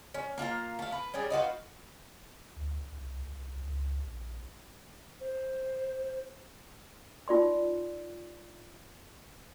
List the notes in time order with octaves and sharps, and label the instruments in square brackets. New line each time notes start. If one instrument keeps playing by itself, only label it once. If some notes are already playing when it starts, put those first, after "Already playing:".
[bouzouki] C#4
A#3 F4 F5 A#5
A3 F5
B4
G3 C#4 D4 G#4
D#4 F4 F#4 B4
[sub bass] D2
C2
C2
C#2
A#1
[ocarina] C5
[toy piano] D#4 F4 D5 C6